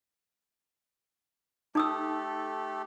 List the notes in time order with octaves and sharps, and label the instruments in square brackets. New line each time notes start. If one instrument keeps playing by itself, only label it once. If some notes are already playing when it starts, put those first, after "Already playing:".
[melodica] A3 G4 A4 [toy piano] D#4 D#6 E6